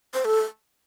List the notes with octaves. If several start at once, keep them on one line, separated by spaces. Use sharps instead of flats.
C5
A4